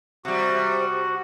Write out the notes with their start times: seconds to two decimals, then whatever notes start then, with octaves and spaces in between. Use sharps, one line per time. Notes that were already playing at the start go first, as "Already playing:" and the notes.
0.25 C3 G3 F#4